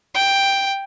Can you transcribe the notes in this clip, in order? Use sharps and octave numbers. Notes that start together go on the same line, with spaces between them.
G5